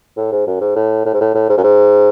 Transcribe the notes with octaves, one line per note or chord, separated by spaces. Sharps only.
A2
G#2
F#2
G#2
A2
A2
G#2
A2
A2
G#2
F#2
G#2